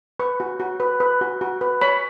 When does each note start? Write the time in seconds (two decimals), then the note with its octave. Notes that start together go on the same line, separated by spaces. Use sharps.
0.19 B4 C#6
0.40 F#4
0.60 F#4
0.80 B4
1.00 B4
1.21 F#4
1.41 F#4
1.61 B4
1.81 C#5 B5